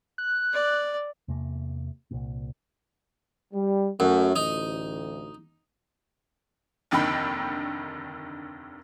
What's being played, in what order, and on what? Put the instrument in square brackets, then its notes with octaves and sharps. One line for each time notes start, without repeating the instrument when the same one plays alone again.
[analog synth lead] F#6
[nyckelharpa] D5
[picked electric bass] E2 C3 A#3
C2 A#2
[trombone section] G3
[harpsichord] F#2 [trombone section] A3 C#4 F#4
[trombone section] A1 D2 [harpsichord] D#4
[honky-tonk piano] F1 D#2 D3 D#3 G5 B5